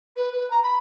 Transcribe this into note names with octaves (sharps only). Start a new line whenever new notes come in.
B4
B4
A#5
B5